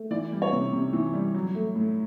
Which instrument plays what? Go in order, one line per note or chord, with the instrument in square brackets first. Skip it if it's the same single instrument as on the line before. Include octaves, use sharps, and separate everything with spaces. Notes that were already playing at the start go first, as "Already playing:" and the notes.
Already playing: [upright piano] A3
E3 D5
G3
C#5
C3
C3
E3
G3
F#3
A3
A2